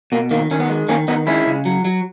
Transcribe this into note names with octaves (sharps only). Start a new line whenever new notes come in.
B2 A#3
D#3 A#3
D#3 C#4
B3
G#3
D#3 A#3 C#4
D#3 B3 D#4
G#3 C#4 E4
C#3
F#3
F#3